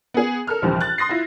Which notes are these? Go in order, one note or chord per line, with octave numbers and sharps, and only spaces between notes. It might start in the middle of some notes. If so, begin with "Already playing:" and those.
B3 G#4
A4 A#4 F6
A#1 D#2 C3 E3 G3
F#6 A6
C6 D#6 A#6 C7
E4 F4